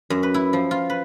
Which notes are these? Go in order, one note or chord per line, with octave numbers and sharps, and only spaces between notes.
F#2
B4
E4
F3
F4
B4